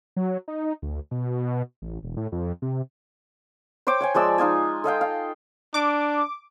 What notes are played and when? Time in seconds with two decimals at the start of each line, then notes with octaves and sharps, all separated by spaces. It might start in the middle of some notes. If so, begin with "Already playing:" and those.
0.17 F#3
0.48 D#4
0.82 D2
1.11 B2
1.82 A1
2.03 E1
2.17 A2
2.32 F2
2.62 C3
3.87 C5 C#5 G5 D6
4.00 C#5 G5 G#5
4.14 F3 G#3 D5 E6
4.38 D#4 F4 D#5 G#5
4.84 A4 D#5 F5 G5
5.01 F5
5.74 D4 D6